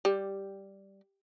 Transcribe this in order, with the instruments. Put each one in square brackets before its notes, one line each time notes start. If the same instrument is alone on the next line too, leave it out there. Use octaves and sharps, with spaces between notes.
[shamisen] G3